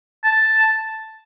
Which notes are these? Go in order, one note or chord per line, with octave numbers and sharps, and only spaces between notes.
A5